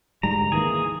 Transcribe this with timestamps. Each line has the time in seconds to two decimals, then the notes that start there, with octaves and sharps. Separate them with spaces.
0.23 D2 G#2 G3 A#5
0.52 D#3 E3 A#3 G#4